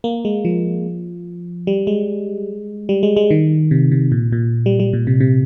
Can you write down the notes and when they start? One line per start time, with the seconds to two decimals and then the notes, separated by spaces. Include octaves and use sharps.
0.04 A#3
0.25 G#3
0.45 F3
1.67 G3
1.87 G#3
2.89 G3
3.03 G#3
3.16 G#3
3.30 D#3
3.71 C3
3.91 C3
4.12 A#2
4.32 A#2
4.66 G3
4.79 G3
4.93 A#2
5.07 C3
5.20 C3